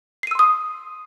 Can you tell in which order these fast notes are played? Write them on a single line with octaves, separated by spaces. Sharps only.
C7 D#7 E6 C6 D#6